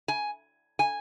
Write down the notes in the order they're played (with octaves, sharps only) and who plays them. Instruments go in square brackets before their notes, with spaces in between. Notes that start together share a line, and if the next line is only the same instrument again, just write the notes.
[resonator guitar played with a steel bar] G#5
G#5